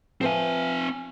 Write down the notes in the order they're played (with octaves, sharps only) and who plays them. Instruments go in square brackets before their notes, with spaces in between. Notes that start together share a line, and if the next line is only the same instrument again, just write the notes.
[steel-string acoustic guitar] F3 B4 E5 [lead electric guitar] C4 G#5